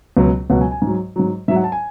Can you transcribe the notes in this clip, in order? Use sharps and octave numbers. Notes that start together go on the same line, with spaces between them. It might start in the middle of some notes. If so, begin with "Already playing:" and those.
C#2 B2 F#3
C#2 B2 F#3 F#5
G#5
G#5
G#2
F#3
G#2 F#3
G#2 F#3 E5
F#5
A5
G#5